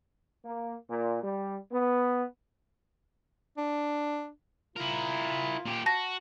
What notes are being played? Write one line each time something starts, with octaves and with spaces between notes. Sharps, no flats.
A#3
A#2
G3
B3
D4
E4 F4 A#4
A#2 G4
F#4 A5 A#6